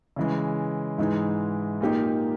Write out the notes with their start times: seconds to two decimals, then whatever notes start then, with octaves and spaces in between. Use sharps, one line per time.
0.16 C#3 E3 G#3
0.98 G#2 E3 G#3 D#4
1.81 A#2 A#3 D#4 G4